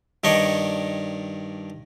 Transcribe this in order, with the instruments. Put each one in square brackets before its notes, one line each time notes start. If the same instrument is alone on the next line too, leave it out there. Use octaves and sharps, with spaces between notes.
[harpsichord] G2 D#3 D4 C#5 D#5